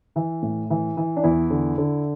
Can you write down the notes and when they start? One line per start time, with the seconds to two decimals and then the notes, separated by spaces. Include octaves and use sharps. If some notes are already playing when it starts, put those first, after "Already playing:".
0.16 E3
0.42 A2
0.70 E3
0.97 E3
1.17 D4
1.24 E2 E4
1.50 D3
1.78 D3